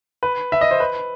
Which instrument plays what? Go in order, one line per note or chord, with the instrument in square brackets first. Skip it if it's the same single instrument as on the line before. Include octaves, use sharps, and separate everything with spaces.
[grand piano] B4
E5
D#5
C5
B4